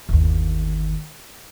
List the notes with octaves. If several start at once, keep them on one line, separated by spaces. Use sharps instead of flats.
G1 D#2